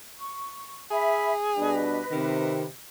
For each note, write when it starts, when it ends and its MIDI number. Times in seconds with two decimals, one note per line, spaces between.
0.19 0.79 85
0.91 1.84 68
0.91 1.32 76
0.91 1.32 83
1.57 2.01 47
1.57 2.01 55
1.57 2.01 62
1.57 2.63 71
1.57 2.63 75
2.12 2.67 48
2.12 2.65 51